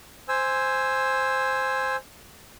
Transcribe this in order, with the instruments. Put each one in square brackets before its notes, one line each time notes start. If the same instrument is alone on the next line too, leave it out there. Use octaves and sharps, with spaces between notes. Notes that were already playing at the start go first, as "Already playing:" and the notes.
[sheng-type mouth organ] C5 G#5 E6